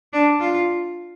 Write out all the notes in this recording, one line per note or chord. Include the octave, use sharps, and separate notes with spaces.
D4
F4